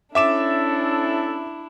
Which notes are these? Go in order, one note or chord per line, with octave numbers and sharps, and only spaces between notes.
C#4 D4 E4 A4 E5 D6 E7